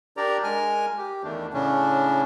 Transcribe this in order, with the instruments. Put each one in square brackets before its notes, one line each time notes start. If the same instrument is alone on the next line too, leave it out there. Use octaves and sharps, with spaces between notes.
[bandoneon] D4 G4 A#4 D5 A#5
G#3 A#4 G#5 F6
G4
E2 D#3 A3 D4
A2 C#3 C#4 D4